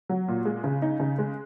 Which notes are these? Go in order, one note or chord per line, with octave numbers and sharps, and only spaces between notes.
F#3
A#2
G#3
C#3
D#4
C#3
G#3